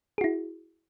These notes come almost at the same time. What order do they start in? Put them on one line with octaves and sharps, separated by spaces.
G#4 F#4 E4